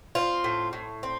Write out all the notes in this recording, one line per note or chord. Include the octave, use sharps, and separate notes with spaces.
C4 F4
A2
A2
C4